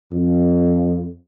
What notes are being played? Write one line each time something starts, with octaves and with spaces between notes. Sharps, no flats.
F2